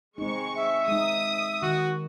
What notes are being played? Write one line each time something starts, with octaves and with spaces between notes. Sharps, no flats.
G#3 C4 D#4 C#6
E5
G#3 D#4 D#6
D#3 F#4